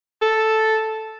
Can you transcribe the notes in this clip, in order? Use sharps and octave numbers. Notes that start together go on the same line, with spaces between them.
A4